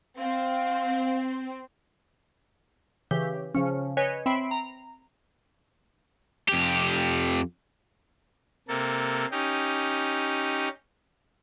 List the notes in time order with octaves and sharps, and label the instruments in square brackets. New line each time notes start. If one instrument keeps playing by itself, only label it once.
[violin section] C4 [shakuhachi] F5
[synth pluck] C#3 E3 G4
C#3 F3 C#4
B4 C#5 D#5 G#5
C4 E5 B5 C7 D7
A#5
[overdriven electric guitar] F2 G4
[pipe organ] C3 A#3 A4
C#4 D#4 G4